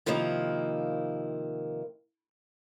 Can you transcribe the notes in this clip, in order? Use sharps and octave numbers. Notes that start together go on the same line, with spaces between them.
C3 D#3 F3 A#3 E4